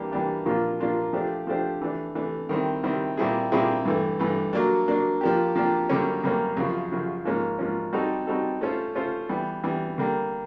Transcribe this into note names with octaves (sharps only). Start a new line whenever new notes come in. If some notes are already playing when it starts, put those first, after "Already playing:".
Already playing: E3 G3 A#3 D4 G4
E3 G3 A#3 D4 G4
A#2 F3 A#3 D4 F4
A#2 F3 A#3 D4 F4
F3 A3 D4 G4 C5
F3 A3 D4 G4 C5
E3 A3 D4
E3 A3 D4
D#3 G3 C4 E4
D#3 G3 C4 E4
A#2 G3 C4 E4 G#4
A#2 G3 C4 E4 G#4
G2 E3 A3
G2 E3 A3
F#3 A#3 D4
F#3 A#3 D4
F3 A#3 D4 G4
F3 A#3 D4 G4
F#2 D3 G3 A#3 C#4
F#2 D3 G3 A#3 C#4
F#2 C#3 F3
F#2 C#3 F3
G#2 F3 A#3 C#4
G#2 F3 A#3 C#4
G3 C4 D#4 F#4 A4
G3 C4 D#4 F#4 A4
A3 C#4 F4 A4 C5
A3 C#4 F4 A4 C5
E3 G3 B3
E3 G3 B3
D3 G3 A#3